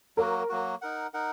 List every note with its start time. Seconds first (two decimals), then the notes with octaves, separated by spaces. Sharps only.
0.17 F#3 A#3 F#4 A#4
0.49 F#3 A#3 F#4
0.82 D#4 A#4 F#5
1.14 D#4 A#4 F#5